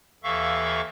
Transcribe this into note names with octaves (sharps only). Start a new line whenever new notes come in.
D#2 E3 A4 E5 F5 C#6